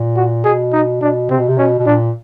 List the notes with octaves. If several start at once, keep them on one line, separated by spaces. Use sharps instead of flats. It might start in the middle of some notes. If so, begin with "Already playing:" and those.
Already playing: A#2
F#4
B2 G#4
D#4
B2 D4
C3 C4
B2
C3
B2 C#4
B2
A#2 D4